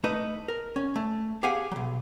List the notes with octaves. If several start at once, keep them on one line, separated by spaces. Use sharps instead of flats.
A3 D#4 B4 D#5
A#4
C#4
A3
G4 G#4 F5 F#5 G#5
B1 F#3